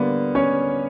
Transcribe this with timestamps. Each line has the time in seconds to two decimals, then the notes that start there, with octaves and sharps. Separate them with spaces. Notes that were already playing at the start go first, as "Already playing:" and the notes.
Already playing: D3 G3 A#3 B3
0.35 C#4 C#5